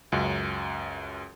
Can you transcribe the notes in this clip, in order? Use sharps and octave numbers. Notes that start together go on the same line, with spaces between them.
C#2 F#2